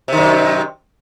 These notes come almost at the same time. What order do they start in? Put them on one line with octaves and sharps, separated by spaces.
C3 D#3 F#2